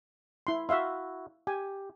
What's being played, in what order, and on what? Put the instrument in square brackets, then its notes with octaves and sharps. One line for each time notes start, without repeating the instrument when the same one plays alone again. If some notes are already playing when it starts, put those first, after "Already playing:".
[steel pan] E4 C6
[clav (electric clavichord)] E4 F#4 [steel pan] E5 F5 C6
[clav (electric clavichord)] G4 [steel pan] G#5